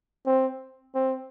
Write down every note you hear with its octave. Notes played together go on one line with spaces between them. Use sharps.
C4
C4